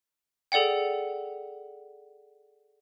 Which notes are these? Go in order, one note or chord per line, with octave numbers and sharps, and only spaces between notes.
G#4 A4 D5 F#5 G5